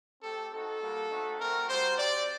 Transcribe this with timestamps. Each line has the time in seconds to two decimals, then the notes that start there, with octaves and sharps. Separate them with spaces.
0.22 A3 C4 G4 A4
0.52 C4 D#4 F#4 A4
0.81 G3 A#3 F#4
1.10 A3 C4 D#4 F#4
1.39 A3 C4 F#4 A#4
1.68 G3 C4 F#4 C5
1.97 C4 G4 D5